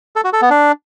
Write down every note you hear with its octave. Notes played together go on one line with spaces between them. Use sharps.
A4
F#4
A4
B3
D4